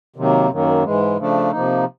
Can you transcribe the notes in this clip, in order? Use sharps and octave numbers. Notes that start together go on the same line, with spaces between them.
C3 D#3 F#3 A#3
F#2 D#3 F#3 A#3
G#2 E3 G#3
C#3 F3 A3 D4
C3 F3 A#3 D#4